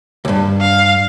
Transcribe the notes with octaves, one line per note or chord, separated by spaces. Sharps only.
C#2 G2
F5